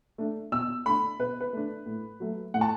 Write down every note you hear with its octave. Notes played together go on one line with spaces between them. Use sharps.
A3 D4
B2 E6
A3 D4 B5
B2 B4
B4
A3 D4
A2
F#3 A3
A2 F#5
A5